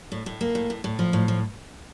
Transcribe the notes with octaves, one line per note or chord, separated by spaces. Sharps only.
A2
A2
A#3
A2
A2
A2
F3
A2
F3